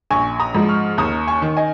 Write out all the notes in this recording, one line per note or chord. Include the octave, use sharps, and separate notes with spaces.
A#1 G#5 C#6
A#5 D#6
G#2 F3
C#6 F6
D#2 A#5 D#6
G#5 C#6
D#3
D#5 G#5